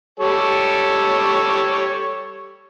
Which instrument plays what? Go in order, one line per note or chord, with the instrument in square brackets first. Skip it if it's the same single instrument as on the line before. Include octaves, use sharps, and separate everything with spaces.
[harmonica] G3 A4 C#5